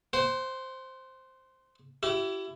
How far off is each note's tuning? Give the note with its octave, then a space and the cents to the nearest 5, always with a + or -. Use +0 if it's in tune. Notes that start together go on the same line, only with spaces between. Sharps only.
C5 +0 F#5 +40
E4 +20 G4 -40